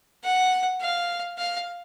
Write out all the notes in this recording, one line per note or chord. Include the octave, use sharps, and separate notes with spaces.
F#5
F5
F5